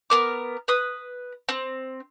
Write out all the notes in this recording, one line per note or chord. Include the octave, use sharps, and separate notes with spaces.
B3 A#4 D6
B4 D#6
C4